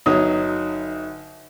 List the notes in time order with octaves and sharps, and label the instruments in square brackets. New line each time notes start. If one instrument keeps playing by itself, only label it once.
[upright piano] G1 F#3 D#4 C#5 D#6